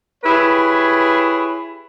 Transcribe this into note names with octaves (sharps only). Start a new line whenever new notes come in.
E4 G4 G#4 B4 C#5